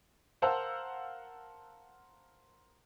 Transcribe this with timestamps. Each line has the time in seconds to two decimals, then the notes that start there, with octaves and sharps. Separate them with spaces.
0.42 A#4 C5 F5 F#5 A5 E6